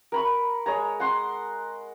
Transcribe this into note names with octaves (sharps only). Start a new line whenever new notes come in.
A#4 B5 C#6
G#3 C#5 A#5
F#5 C6 C#6